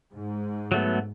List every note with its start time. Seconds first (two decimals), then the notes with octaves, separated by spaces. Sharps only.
0.13 G#2
0.72 F#3 A3 B3